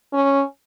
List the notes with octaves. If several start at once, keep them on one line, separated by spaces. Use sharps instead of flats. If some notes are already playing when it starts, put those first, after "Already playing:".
C#4